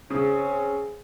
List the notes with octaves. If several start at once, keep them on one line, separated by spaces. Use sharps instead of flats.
C#3 C4 C#4